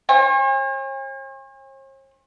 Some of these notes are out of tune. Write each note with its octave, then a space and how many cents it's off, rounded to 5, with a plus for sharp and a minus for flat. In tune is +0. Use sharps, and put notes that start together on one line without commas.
C#5 -45 G#5 -45